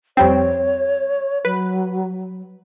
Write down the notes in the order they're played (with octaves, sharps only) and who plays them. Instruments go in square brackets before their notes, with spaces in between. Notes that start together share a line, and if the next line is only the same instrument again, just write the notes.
[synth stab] F2 G3 C4 [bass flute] C#5
[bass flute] F#3 [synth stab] B4